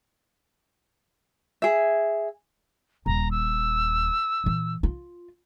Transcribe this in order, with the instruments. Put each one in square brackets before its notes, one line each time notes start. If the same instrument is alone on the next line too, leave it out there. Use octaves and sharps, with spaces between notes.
[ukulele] G#4 E5
[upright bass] D#1 [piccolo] A#5
[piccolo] E6
[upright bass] A#2 E3
F4